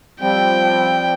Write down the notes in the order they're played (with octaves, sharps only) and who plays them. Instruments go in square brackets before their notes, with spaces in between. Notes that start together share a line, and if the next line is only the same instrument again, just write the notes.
[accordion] F3 G3 C4 [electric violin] G5